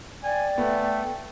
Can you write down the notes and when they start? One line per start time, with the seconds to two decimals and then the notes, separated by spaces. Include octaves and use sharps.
0.24 D5 G5 G#5
0.58 A3 B3